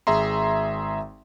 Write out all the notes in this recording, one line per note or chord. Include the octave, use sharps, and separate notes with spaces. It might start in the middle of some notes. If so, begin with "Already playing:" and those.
G#1 G#4 E5 A#5 C6